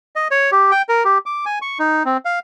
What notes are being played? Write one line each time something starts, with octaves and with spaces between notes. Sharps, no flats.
D#5
C#5
G4
G5
A#4
G4
D6
G#5
C#6
D#4
C4
F5